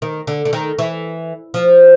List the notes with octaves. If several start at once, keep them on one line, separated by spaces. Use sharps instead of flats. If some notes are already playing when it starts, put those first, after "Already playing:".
D#3
D3
D3
D#3
E3
F3